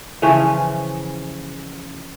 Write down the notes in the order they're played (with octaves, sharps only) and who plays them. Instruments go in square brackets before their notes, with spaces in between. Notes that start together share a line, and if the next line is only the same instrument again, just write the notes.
[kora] C#3 E3 F3 C#4